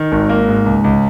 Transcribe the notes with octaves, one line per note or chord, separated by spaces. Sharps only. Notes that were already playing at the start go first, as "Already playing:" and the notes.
Already playing: D#3
G#1
A#3
G#2
C#2
C#2